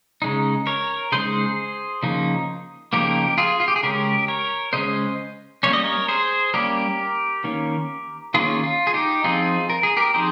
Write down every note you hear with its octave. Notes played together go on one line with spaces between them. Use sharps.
C#3 G#3 D#4
A#4 C#5
C#3 G#3 D#4 G#4 C5
C#3 F3 A#3 D#4
C#3 F3 A#3 D#4 G4 A#4
F4 G#4
F4
G4
G#4
C#3 G#3 C#4 G4 A#4
A#4 C#5
C#3 G#3 C#4 C5 D#5
G3 A#3 C#4 C#5
D#5
A#4 C#5
G#4 C5
G3 A#3 C#4 G4 A#4
D#3 A#3 C#4
D#3 A#3 C#4 F4 G#4
F4
G#4
D#4 G4
F3 C4 D#4 F4 G#4
A#4
G#4
G4 A#4
F3 C4 D#4 G#4 C5